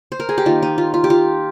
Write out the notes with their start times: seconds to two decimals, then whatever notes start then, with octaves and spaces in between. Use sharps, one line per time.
0.12 C5
0.20 A#4
0.29 G#4
0.38 G4
0.46 D#3 A#3 D#4 F4
0.62 D#4
0.78 F4
0.94 F4
1.04 G4
1.10 F4